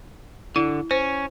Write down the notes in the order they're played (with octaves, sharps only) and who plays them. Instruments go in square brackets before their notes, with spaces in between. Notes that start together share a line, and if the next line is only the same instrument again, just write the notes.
[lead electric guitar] D3 [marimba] E4
[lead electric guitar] C#4 [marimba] C5